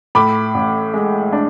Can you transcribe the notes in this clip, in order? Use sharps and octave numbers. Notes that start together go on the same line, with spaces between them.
A2 B5 D6
A1
G#3
D4